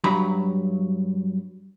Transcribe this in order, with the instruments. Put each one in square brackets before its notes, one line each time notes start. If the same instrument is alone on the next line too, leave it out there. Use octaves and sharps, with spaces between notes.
[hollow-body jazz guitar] G2 F#3 A#5 B5